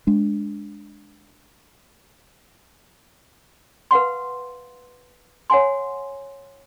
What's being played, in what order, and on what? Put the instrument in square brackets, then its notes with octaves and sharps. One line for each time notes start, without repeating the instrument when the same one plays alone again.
[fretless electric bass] G#3 D4
[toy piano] B4 F5 F#5 C6
C#5 F#5 G#5 C6